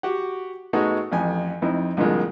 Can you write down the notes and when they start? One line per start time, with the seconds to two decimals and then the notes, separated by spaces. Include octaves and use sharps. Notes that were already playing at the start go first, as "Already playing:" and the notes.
0.03 F#4 G4 F#5
0.73 G#2 G#3 A3 B3 D#4 F#4
1.12 A1 F2 G#5
1.62 F2 C4 D#4 E4
1.97 C2 F2 D3 F3 G#3 A#3